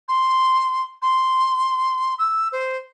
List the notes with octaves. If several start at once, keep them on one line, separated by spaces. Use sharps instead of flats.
C6
C6
E6
C5